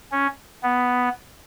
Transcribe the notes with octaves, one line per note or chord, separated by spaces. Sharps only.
C#4
B3